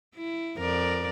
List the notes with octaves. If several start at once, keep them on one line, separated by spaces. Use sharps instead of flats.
E4
F2 A#4 D5